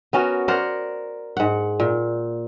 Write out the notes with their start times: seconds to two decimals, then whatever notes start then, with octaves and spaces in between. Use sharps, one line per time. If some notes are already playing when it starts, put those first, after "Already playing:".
0.13 B3 C#4 F#4 A#4
0.48 A#4 C5 D5 F#5
1.37 G#2 F#5
1.80 A#2